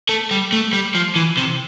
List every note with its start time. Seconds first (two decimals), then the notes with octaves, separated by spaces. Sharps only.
0.09 A3
0.31 G3
0.52 A3
0.73 G3
0.95 F3
1.16 E3
1.37 C3